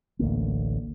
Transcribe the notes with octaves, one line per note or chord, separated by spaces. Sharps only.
A1 D2 A#3